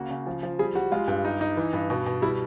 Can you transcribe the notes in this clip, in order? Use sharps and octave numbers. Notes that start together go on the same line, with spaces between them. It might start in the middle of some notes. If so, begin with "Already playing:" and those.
Already playing: C#3 A#3 F#4
C#3
F3
F3
G3 G#4
G3 F#4
G#3 F4
G2
D#4
D#4
E3
G2
B2
B2
G3 E4